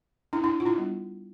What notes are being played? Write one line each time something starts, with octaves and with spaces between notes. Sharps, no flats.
D4 E4
D4 E4
F4
D4 E4
G3 B3 D4